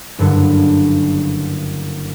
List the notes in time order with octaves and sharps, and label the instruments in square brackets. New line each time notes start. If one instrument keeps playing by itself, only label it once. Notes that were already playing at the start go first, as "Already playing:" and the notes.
[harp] F#1 G2 D3